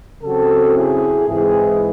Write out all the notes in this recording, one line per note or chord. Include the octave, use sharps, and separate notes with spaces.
C#3 F#3 C4 F#4 A4
E4 G#4
G#2 E3 G#3 C4 E4 G#4